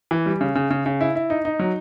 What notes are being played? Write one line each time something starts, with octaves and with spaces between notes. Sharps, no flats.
E3
G3
C#3
C#3
C#3
C#3
E4
E4
D#4
D#4
F#3